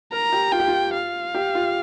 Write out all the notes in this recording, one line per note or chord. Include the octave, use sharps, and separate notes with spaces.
A#4 A#5
G4
F4 G5
G4
F4
F5
G4
F4